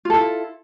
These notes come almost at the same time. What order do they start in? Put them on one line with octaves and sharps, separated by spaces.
F4 A4 E4